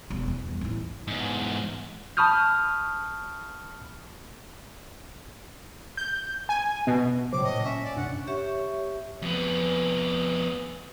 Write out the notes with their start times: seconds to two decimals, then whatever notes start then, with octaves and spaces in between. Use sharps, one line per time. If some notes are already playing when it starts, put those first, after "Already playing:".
0.10 E1 F2
0.28 E2
0.48 G2
0.61 A1 E4
1.08 E2 G#2
2.17 A5 B5 C#6 D#6 F6 G6
5.97 G6
6.49 G#5
6.87 B2
7.32 A2 C#3 F#3 C5 D6
7.44 A#2 D#5
7.64 C#4 E5
7.83 D5
7.96 G2 C3 D4 F#5
8.27 G4 C#5 E5 C#6
9.22 F2 B3